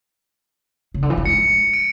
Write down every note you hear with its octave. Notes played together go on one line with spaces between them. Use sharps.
C#3
D3
E3
F#3
G#3 C#7
D7